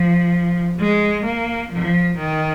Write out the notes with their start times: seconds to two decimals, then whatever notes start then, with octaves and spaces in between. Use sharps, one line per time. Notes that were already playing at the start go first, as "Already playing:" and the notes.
Already playing: F3
0.80 G#3
1.25 A#3
1.72 F3
2.18 D#3